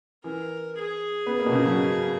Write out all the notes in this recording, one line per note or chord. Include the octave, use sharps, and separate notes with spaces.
E3 A#4
G#4
B3
A#3
B2
C#3
F#3